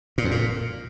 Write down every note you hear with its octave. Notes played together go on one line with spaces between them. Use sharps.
A#2
F2
A#2